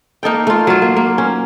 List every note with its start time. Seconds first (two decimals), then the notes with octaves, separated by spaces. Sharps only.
0.23 A#3 D#4 A4 G5
0.47 A3 F4
0.67 F#3 F4
0.82 A#3
0.96 A#3
1.18 C#4